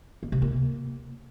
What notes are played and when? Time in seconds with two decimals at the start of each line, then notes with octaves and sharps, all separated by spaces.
0.23 A#3
0.32 C3
0.42 A#3